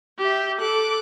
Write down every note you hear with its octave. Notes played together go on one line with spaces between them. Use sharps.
G4 E5
A4 D6 F#6